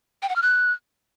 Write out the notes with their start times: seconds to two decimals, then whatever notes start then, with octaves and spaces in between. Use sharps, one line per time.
0.22 G5
0.29 F#5
0.36 F6
0.42 F#6